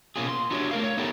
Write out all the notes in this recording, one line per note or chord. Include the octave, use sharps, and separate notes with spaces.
B2 A#3 C#4 F4 G#4
C6
B3 D4 E4 F#4 G4 C#5
A3 A#4 F5
C#5
B3 D#4 E4 G4 A4 G5